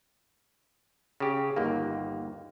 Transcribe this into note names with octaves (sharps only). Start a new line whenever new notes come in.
C#3 G4
G1 D#2 A#3